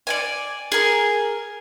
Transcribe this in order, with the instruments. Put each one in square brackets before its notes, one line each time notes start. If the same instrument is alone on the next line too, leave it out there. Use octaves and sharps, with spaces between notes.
[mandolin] D5 D#5 G#5
G#4 A#4